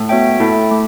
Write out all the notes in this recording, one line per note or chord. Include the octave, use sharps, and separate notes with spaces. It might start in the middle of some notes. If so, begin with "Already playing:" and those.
Already playing: A2
B3 F#4 C#5 E5 G5
A2 E4 A4 E5
A3